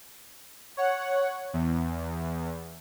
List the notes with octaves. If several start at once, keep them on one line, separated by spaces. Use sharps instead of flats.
C#5 F#5
E2